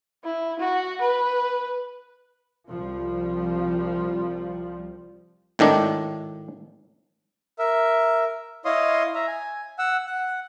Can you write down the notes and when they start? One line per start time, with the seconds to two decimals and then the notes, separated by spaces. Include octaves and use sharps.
0.24 E4
0.59 F#4
1.01 B4
2.69 C2 F3 G3
5.59 G#1 A2 D#3 D4
7.59 A#4 E5
8.65 E4 C#5 D#5 F5 C6 D#6
9.15 E5 A#5
9.27 G#5
9.79 F#5 E6
10.06 F#5